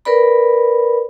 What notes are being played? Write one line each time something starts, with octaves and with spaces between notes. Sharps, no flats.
A#4 B4 D5 B5